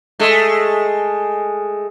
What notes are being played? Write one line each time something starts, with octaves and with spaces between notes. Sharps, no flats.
G#3 A3